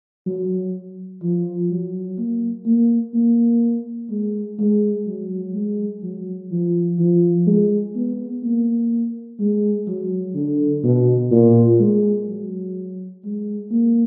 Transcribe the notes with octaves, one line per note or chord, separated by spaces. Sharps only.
F#3
F3
F#3
A#3
A#3
A#3
G#3
G#3
F#3
G#3
F#3
F3
F3
G#3
B3
A#3
G#3
F#3
D3
B2
A#2
G#3
F#3
G#3
A#3